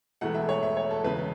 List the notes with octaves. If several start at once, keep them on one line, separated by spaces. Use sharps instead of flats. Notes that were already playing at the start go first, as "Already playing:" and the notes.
E1 E2 E3 A3 F#5
E5
C#5
E5
C#5
A4
E1 E2 C#3 B4